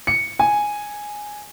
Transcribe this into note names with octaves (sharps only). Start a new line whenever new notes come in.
C#7
G#5